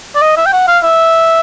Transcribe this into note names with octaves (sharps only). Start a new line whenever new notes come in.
D5
D#5
E5
G5
F#5
F5
E5